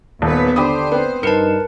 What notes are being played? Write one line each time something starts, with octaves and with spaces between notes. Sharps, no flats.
D#1 D#2 B3 B4
D3 D4 G4 C5 B5 D#6
B3 C4
G2 D#4 A#4 B4 A5 C#7 E7